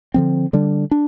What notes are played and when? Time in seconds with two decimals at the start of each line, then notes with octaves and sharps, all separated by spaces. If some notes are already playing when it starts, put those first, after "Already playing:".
0.14 D3 F3 C4
0.53 D3 G3 D4
0.91 D4